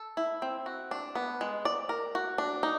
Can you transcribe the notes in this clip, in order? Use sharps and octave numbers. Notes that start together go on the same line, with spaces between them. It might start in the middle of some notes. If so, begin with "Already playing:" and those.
Already playing: A4
E4
C4
F#4
D4
B3
G#3
D5
A#4
F#4
D4
D#4